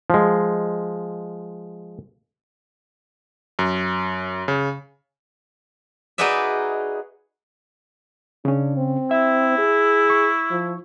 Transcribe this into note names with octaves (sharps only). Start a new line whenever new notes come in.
F3 G#3
F#2
C#3
D#4 F#4 G#4 B4 D5 E5
C#3 C#4 D4
C4
E4 E5
G#4
C#6
F3